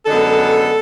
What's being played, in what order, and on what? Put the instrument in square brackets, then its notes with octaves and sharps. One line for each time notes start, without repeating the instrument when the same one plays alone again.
[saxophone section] F#2 D3 G#3 B3 A4